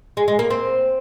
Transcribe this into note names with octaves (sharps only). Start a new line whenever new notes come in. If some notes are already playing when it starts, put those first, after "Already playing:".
G#3
G#3
A#3
C4